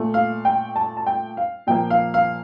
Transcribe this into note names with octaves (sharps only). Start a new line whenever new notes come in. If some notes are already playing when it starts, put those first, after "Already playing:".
Already playing: A#2 A3
F5
G5
A5
A5
G5
F5
A#2 F3 A#3 G5
F5
F5